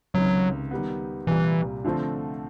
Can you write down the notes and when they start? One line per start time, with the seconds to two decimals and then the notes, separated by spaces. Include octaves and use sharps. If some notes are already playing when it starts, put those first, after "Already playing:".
0.14 C#2 C3 D#3 F#3
0.71 D#3 G3 B3
1.27 C2 A#2 E3 G3
1.85 D3 F3 A3 C4